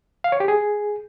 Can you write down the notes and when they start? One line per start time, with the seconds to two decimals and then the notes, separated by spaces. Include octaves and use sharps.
0.24 F5
0.32 C#5
0.40 G4
0.48 G#4